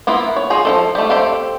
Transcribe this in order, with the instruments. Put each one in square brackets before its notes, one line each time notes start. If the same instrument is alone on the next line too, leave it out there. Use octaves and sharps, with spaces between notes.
[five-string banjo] A#3 B3 E4 F4
C#5
F4 G#4 A#5
F3 E4 A4
G3 A3
C4 E4 G4 A4 F5